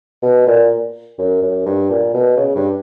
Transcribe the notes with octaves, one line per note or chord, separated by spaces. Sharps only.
B2
A#2
F#2
F#2
G2
A#2
B2
C#3
G2